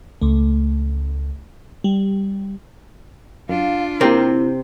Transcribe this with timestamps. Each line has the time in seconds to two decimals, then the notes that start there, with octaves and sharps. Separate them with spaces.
0.22 C#2 A3
1.84 G3
3.49 F#2 D4 F4 F5
4.01 C3 A#3 C4 E4 G4 A#4